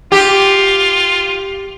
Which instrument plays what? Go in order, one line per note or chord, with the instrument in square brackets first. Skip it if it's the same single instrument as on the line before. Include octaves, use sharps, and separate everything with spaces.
[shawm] F4 [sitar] G4